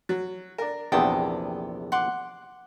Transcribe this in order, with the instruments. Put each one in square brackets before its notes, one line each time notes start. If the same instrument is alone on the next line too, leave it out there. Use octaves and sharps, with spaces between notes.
[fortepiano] F#3
D4 A#4
[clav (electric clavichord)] A#1 E2 C3 [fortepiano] B3 [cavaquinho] G5 A5 D#6
[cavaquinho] F#5 C6 D6